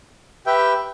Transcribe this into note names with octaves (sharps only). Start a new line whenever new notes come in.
G4 B4 E5 G5